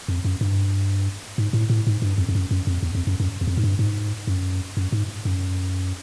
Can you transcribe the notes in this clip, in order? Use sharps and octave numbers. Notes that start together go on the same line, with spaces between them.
F2
F#2
G2
G#2
A2
A2
G#2
G2
F2
F2
F#2
F#2
F2
E2
F2
F#2
F#2
E2
F2
G#2
G2
G#2
F#2
F#2
G#2
F#2